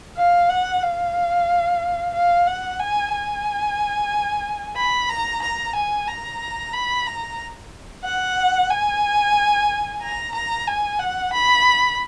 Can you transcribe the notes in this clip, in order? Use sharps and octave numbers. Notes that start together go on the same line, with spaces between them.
F5
F#5
F5
F5
F#5
G#5
G#5
B5
A#5
A#5
G#5
A#5
B5
A#5
F#5
G#5
A#5
A#5
G#5
F#5
B5